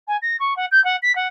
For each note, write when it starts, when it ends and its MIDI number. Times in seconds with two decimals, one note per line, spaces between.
0.07 0.17 80
0.22 0.36 94
0.39 0.56 85
0.56 0.65 78
0.71 0.82 91
0.84 0.96 78
1.02 1.14 95
1.15 1.27 78